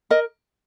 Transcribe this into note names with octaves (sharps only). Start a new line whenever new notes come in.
A#4 D#5